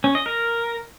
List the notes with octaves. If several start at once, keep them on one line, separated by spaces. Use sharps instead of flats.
C#4
D#5
A#4